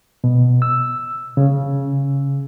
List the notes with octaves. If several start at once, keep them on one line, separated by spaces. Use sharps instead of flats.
B2
E6
C#3